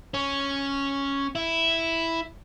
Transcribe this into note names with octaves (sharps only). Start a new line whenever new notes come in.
C#4
E4